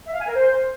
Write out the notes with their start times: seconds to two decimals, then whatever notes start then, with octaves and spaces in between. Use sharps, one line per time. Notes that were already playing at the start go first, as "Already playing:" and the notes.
0.06 E5
0.13 F5
0.20 G#5
0.27 A#4
0.34 C5